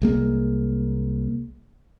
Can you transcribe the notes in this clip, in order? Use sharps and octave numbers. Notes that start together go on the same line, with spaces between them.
C2 G#3 A#3